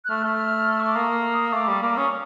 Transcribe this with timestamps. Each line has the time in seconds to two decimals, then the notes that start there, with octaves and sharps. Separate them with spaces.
0.05 F#6
0.09 A3 F6
0.24 A3
0.80 C#6
0.87 D6
0.96 A#3 D#6
1.53 A3 D6
1.68 G3
1.82 A#3 D6
1.97 C#4 D#6